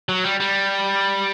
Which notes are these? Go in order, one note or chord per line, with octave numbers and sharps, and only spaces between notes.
F#3
G3
G3